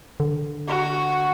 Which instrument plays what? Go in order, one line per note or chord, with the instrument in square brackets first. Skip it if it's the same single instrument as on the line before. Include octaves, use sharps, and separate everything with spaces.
[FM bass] D3
[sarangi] F#4